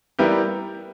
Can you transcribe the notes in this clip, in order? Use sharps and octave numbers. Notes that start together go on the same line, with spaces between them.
G3 B3 E4 G4 A#4